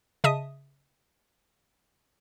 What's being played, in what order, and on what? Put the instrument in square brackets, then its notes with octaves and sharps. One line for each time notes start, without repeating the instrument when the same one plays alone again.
[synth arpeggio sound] C#3 D#5 E5 A5 D#6 D#7